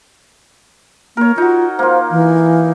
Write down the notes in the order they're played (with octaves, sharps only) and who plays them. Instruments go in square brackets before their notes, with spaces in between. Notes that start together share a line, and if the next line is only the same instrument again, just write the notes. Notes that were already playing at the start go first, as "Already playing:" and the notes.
[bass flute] A#3 [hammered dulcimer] A#4 C#5
[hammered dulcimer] D#4 F#4 [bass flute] F4
[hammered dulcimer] A#3 F4 [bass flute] C5
[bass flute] E3